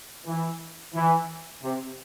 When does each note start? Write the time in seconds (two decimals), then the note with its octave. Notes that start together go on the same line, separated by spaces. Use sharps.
0.26 E3
0.95 E3
1.63 C3